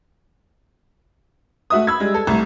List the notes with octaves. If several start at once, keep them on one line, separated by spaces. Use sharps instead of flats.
A3 F#4 E5 D#6
B5 E6 G#6
G3 G#3
A4
C2 A3